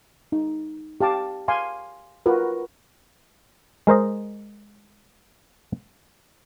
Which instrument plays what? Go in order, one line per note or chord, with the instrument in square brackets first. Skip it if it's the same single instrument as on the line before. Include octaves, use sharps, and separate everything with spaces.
[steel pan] D#4
G4 F5 A5 D6
F5 G#5 C6 D6
F4 F#4 A#4 B4
[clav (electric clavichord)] G#3 A#4 C5 D#5